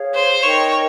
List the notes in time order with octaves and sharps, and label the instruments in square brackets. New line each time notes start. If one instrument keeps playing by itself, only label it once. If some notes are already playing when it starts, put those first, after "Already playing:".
Already playing: [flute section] G#4 C#5 F5
[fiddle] C5
[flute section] D#4 A#4 D#5 G5 [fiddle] C#5